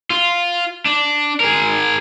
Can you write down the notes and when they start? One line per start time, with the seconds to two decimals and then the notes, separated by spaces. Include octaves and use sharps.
0.10 F4
0.86 D4
1.40 G#4 A#4